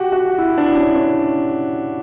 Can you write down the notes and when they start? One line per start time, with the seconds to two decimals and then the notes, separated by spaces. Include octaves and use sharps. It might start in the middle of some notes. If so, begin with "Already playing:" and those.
Already playing: F#4 G4
0.12 F#4
0.38 E4
0.58 D4
0.77 C#4
0.96 C#4